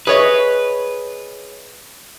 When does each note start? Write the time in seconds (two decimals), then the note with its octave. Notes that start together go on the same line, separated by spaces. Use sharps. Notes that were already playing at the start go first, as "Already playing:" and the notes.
0.07 G#4 B4 C#5 D#5